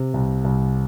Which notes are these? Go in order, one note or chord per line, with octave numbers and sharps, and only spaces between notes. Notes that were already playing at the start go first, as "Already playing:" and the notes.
Already playing: C3
C2
C2